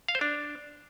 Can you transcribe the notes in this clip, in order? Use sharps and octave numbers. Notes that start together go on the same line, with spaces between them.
F5
C5
D4